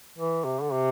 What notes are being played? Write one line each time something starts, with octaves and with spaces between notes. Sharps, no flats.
E3
C3
D3
C3